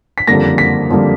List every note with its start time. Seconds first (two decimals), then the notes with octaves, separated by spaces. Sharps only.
0.18 B6
0.28 F#1 F2 D3 G3 A#3 A#6
0.58 B6
0.89 F#1 F2 D3 G3 A#3